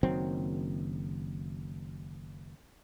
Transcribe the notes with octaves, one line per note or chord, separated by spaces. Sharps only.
F#1 D#3 F#3 C4